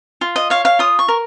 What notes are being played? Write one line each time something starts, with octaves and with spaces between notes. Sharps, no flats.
F4
D#5
C#5 F5
F5
F4 D#6
C#6
A#4